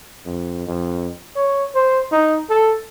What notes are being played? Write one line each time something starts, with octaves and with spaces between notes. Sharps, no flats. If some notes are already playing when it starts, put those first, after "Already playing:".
F2
F2
C#5
C5
D#4
A4